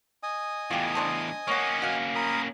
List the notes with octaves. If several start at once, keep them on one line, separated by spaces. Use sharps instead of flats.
D#5 G#5 D#6
E2 A2 F4 G4
D4 C5 A5
A#3 C#4 C#5 F#5
F#4 F5
A#4 B5 D#6